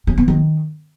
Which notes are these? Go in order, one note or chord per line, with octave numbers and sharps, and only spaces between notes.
C#4
B3
D#3